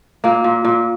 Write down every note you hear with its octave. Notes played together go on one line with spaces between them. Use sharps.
A#2 A#3
A#2
A#2